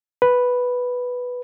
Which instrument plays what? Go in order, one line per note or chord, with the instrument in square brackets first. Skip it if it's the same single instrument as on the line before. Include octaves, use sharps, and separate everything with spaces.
[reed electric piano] B4